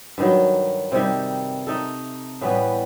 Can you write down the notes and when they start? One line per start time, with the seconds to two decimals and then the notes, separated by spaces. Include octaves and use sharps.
0.18 G2 D#3 F#3
0.92 C3 D#3 G3
1.67 A3 D#4 A4
2.41 A2 E3 G3 B3